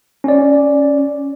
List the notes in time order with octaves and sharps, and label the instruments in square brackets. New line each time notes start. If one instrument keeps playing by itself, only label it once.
[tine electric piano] C#4 D5